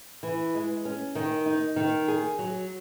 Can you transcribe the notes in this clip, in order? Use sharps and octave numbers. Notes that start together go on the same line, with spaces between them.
E3
G#3
C#4
D#3
D#4
D#3
G#4
F#3